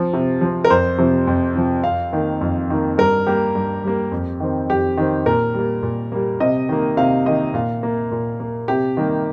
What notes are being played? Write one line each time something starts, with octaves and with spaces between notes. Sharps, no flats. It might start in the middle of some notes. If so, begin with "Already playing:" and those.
Already playing: F3 C4
C3
F3 C4
A#4
F2 C5
C3 F3
F2
C3 F3
F2 F5
D#3 A#3
F2
D#3 A#3
G2 A#4
G3 A#3 G4
G2
G3 A#3
F2
D#3 C4
F2 G4
D#3 C4
A#2 A#4
G3 A#3
A#2
G3 A#3
C3 D#5
D#3 A#3
C3 F5
D#3 A#3 D#5
A#2 F5
A#3
A#2
A#3
C3 G4
D#3 G3 A#3